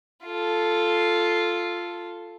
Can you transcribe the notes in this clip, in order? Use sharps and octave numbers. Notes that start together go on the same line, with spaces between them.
F4 A4